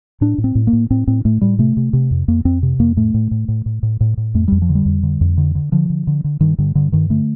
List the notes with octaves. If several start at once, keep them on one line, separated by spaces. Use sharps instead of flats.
A2 D4
A2
C4
A2
A#3
A2
A2 C4
A2 C4
A2 A3
A2 G3
C3 A3
C3
C3
F2
F2 A#3
F2 C4
C3
F2 A#3
A2 A3
A2
A2
A2
A2
A2
A2
A2
F2 A3
F2 G3
F3
D3
G3
F2
D3
F2
D3
D3
D3 F3
D3
D3
D3
G2 D#3
G2 D3
G2 D3
G2 D#3
D3 A3